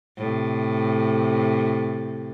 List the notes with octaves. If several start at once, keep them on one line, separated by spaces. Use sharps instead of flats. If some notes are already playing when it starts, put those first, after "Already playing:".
A2 C3